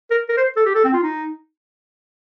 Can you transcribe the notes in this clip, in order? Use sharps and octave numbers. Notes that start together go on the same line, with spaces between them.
A#4
A#4
C5
A4
G4
A4
C4
F4
D#4